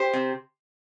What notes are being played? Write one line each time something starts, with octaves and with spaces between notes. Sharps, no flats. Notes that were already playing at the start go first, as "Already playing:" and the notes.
Already playing: G4 C5
C3